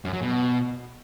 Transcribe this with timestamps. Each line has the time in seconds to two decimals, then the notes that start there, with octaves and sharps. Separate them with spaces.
0.05 F#2
0.13 F#3
0.22 B2